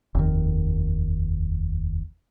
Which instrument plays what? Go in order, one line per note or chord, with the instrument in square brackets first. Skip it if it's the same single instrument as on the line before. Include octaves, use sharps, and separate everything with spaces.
[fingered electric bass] F1 D#2 D#3